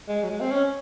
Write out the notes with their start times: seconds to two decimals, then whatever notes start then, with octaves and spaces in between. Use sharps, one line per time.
0.09 G#3
0.23 F#3
0.30 G#3
0.41 C4
0.52 C#4